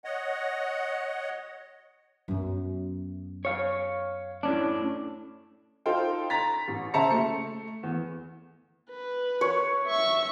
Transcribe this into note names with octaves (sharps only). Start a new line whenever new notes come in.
C#5 D#5 F#5
F#2 B3
C#5 F5
A2 C#4 D4
D#4 F4 A4 C5 F5 G5
A#5 A6 B6
A1
C#3 C5 E5 A5 A#5 C#7
A3 C#7
E2
B4
C#5
E5 C#6